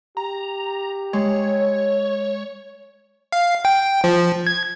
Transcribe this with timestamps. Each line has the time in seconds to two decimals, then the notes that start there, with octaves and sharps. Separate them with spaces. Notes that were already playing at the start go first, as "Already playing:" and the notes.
0.17 G4 A#5
1.13 G#3 C#5
3.32 F5
3.65 G5
4.04 F3
4.47 G#6